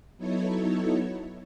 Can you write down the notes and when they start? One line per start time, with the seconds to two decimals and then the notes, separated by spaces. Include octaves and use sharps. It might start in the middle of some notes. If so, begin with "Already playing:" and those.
0.17 F#3 B3 D#4 E4 A4 C#5